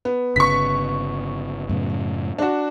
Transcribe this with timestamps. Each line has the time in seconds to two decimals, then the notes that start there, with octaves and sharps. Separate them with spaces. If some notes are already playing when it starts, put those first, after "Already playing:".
0.05 B3
0.36 G1 C#3 C#6 B6
1.69 F#2 A2 C#3
2.38 D4 F#4